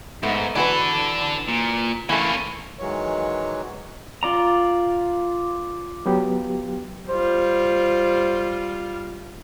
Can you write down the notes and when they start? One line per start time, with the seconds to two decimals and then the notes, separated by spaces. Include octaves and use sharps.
0.23 G#2 A3 B3
0.55 E3 D4 F#4 A4 B4
1.48 A#2
2.09 E3 A3 A#3 C#4
2.79 D#3 E3 F#3 G#3 C#5
4.23 F4 D5 A#5
6.06 F#3 B3 G4
7.09 G3 F4 C5